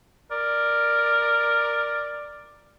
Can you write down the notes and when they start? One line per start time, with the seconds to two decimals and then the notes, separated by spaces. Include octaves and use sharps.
0.31 A#4 D5